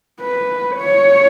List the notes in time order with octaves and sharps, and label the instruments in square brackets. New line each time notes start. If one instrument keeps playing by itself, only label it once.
[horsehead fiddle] B4
C#5